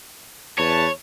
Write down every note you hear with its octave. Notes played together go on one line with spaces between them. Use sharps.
E2 B4 C#5 A5